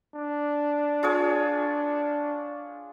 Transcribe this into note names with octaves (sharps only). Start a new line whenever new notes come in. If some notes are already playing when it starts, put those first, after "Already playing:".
D4
F4 G#4 C#5